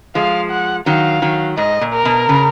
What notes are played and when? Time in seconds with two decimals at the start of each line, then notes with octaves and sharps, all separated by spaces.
0.15 F3 G#3 F5
0.51 F#5
0.86 D#3 F#3 F5
1.22 D#3 F#3
1.57 G#2 D#5
1.81 A#2
1.94 A#4
2.05 B2
2.29 C#3